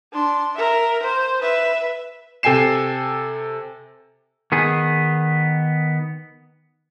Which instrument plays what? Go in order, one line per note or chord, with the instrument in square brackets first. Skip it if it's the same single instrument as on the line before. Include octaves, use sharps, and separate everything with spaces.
[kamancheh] D4 C6
A#4 E5
C5
B4 E5
[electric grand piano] C3 A4 G5 G#5 C7 E7
[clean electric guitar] D#3 B3 G#4